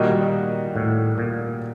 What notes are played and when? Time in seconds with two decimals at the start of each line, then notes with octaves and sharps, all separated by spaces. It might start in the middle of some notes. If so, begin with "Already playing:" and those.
Already playing: A#2 D#3 G3 A#3 D#4 F#4
0.75 A2
1.18 A#2